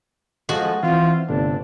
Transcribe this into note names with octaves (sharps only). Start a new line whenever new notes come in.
F3 G#3 F#4 A4 D#5
E3 C4 E4 F4
G1 C3 A3 D4